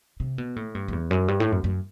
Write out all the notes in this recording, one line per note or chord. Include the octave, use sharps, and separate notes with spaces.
C3
B2
A2
G2
F#2
E2
F#2
G2
A2
F#2
F#2